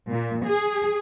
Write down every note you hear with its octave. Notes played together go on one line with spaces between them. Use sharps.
A#2
G#4